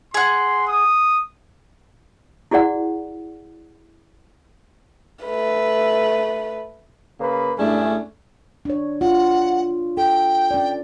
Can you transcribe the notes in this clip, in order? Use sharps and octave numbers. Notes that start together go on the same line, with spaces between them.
G#4 F#5 C6
D#6
E4 F#4 G#4 D5 F#5
A3 B4
C#3 A#3 B4
G2 A3 C#4 D4 E4 G#4
D4 C#5
F4 F#5
A4 G5
C#4 D5